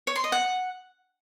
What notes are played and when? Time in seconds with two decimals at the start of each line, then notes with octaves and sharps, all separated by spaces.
0.07 C#5
0.16 C6
0.24 D#5
0.32 F#5